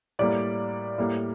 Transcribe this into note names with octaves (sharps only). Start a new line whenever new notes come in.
A2 G3 A#3 D5
A2 G3 A#3